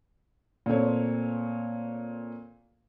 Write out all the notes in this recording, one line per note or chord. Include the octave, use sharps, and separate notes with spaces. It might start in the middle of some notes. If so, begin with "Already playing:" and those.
A#2 A3 C4 C#5